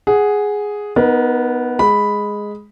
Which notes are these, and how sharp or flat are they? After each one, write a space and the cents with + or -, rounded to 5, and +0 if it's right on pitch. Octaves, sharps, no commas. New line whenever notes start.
G#4 +0 F#5 +0
B3 +0 D#4 +0 A#4 +30
G#3 +0 B5 +0